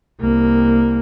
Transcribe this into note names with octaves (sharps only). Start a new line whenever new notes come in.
C2 A#3